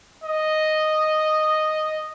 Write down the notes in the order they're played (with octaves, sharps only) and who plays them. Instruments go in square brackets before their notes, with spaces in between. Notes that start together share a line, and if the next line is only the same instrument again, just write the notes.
[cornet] D#5